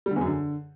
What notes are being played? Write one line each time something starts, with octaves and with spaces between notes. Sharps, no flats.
G3
D3
E2
F#2
D3